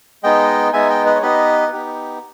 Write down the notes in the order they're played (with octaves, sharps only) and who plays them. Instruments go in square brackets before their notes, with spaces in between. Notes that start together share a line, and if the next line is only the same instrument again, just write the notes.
[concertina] G#3 B3 D#4 D#5 G5
G#3 B3 D#4 E5 G#5
D#5 G5
B4 D#5
C#5
B3 D#4 G4 B4 D#5
B3 D#4 G4